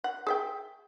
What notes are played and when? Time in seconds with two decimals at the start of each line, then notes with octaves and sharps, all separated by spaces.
0.04 F#5
0.27 G#4 E5 G5